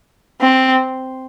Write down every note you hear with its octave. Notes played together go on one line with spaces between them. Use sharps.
C4